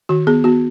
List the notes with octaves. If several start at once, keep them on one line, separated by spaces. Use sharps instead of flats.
D#3 F#4
B3 G#4
B3 F#4